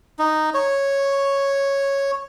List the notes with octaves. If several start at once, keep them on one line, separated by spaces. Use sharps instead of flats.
D#4
C#5